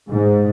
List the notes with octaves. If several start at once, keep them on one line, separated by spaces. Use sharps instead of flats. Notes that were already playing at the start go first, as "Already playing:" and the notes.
G#2